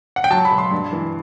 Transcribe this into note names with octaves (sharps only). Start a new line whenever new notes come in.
F#5
G5
F#3 A5
B5
B2
C6
G2
E3